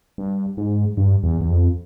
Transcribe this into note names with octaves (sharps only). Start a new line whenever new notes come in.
G2
G#2
G2
E2
E2
F2